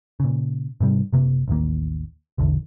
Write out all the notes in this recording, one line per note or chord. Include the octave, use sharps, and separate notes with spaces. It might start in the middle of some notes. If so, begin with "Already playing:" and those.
A#2 C#3
G#2 C3 G3
F#1 C3 A#3
A1 D#2 D#3 A#3
E1 A#1 E2 D3